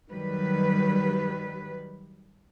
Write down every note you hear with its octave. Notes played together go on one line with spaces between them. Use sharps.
D#3 F#3 G3 B4